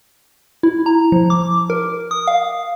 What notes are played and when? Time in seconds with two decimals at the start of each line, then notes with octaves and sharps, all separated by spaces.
0.63 E4
0.86 A#5
1.12 F3
1.30 D6
1.70 A#4
2.11 D#6
2.27 F5